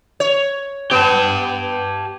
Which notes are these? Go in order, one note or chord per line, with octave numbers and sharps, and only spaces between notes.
C#5
B3 G4 A5